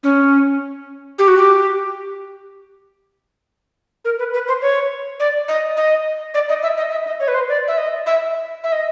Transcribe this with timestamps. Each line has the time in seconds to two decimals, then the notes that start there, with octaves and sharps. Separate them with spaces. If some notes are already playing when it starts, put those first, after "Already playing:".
0.03 C#4
1.19 G4
1.28 F#4
1.37 G4
4.05 A#4
4.19 B4
4.33 B4
4.48 C5
4.62 C#5
5.20 D5
5.48 D#5
5.77 D#5
6.34 D5
6.49 D#5
6.63 E5
6.77 D#5
6.91 E5
7.06 D#5
7.20 C#5
7.28 B4
7.34 C5
7.49 D5
7.68 E5
7.78 D#5
8.06 E5
8.64 E5
8.72 D#5